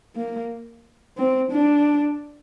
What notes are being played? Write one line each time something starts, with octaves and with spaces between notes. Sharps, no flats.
A#3
C4
D4